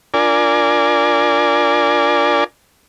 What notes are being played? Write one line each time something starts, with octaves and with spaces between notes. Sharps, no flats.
D4 F4 A#4 D5 G#5